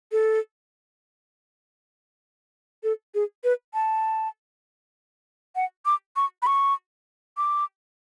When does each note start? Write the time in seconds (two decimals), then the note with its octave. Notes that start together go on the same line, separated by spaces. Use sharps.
0.12 A4
2.83 A4
3.15 G#4
3.44 B4
3.74 A5
5.56 F#5
5.86 D6
6.16 C#6
6.42 B5
6.47 C#6
7.37 D6